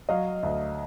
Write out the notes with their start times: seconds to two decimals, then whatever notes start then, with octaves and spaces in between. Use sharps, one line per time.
0.09 F#3 D#5 F5
0.43 D2